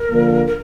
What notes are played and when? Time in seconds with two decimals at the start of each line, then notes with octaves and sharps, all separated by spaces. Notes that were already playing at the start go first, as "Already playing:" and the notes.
Already playing: A#4
0.10 D3 F3 A#3
0.47 A#4